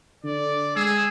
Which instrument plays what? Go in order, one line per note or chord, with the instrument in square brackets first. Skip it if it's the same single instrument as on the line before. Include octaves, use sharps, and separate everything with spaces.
[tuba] D3 [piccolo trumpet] D5
[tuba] G#3 [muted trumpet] G#4 [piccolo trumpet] E6